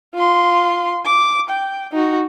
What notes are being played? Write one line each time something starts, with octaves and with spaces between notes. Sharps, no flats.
F4 C6
D6
G5
D#4 F#4